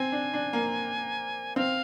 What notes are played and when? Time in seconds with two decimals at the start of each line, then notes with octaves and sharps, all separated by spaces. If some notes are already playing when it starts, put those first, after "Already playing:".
Already playing: C4 G#5
0.12 D4
0.34 D4
0.53 A#3
1.56 C4 F5